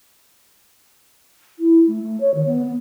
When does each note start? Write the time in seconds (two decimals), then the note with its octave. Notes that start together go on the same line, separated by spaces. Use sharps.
1.59 E4
1.87 A3
2.02 A3
2.21 C#5
2.34 D#3
2.46 B3
2.66 B3